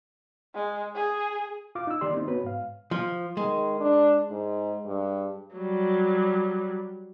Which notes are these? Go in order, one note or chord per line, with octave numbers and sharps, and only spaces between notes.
G#3
G#4
F4 F5 D6
D#4 E6
D#3 A#3 G4 D5 C6
C4 D#4
B3 F#4 B4 C#5
G#2 F5
F3
D#3 G#3
D4
G#2
G2
F#3 G3